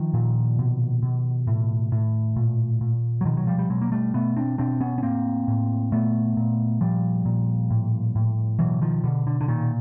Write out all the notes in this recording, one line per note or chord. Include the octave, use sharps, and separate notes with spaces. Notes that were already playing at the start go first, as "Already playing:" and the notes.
Already playing: D#3 F3
A#2
B2
B2
A2
A2
A#2
A#2
F#3
B2 D#3 F3
F#3
F3 G3
G3
B2 F#3 G#3
A#3
G3 A3
B2 A3 B3
C4 D4
B2 C4 D4
B3 C#4
C#4
A2 A#3 C4
A2
A#2 A3 B3
A#2
A#2 F3 G3
A#2
A2
A2
B2 E3 F#3
D#3 F3
B2 D3
D3
D3
A#2 D#3